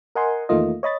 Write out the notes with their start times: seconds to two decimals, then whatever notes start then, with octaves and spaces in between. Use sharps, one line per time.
0.15 A#4 D#5 F#5 G#5 C6
0.49 E2 D#3 A3 A#3 F4 D#5
0.83 C#5 D#5 B5 A6